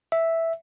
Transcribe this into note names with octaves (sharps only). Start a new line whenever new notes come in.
E5